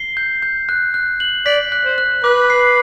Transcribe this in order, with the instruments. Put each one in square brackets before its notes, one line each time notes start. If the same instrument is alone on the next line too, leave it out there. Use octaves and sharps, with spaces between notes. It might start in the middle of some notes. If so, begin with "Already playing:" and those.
Already playing: [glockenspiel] C7 G7
G6
G6
F#6
F#6
F#7
[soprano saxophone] D5 [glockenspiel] B6
[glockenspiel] F#6
[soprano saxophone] C5
[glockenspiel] F#6
[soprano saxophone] B4 [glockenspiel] D6
[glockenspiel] C7